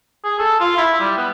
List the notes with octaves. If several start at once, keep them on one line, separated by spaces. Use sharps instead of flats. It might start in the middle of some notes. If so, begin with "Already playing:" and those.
G#4
A4
F4
E4
G3
B3